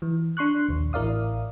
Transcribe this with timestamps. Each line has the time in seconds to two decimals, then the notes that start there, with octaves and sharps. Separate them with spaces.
0.02 E3
0.37 D4 C6 C#6 F#6
0.69 A#1 D#2
0.93 A1 E4 A#4 D5 F5 D#6